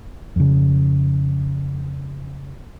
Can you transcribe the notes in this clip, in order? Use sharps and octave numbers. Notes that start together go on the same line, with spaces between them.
F2 C#3